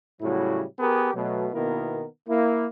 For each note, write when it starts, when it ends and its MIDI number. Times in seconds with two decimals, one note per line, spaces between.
0.21 0.64 45
0.21 0.64 49
0.21 0.64 54
0.21 0.64 55
0.21 0.64 64
0.21 0.64 66
0.79 1.12 59
0.79 1.12 67
0.79 1.12 68
0.79 1.12 70
1.14 1.47 47
1.14 1.47 54
1.14 1.47 57
1.53 2.04 47
1.53 2.04 51
1.53 2.04 58
1.53 2.04 59
1.53 2.04 64
1.53 2.04 70
2.28 2.66 58
2.28 2.66 64